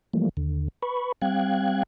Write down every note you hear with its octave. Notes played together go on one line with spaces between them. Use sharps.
E3 F3 G3 A3 A#3
D#2 D3
B4 B5 C#6
G3 C4 F5 G5 F#6 G#6